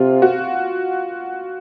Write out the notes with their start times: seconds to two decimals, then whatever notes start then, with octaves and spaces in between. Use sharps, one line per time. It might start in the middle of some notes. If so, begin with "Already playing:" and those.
Already playing: C3 F4
0.22 F#4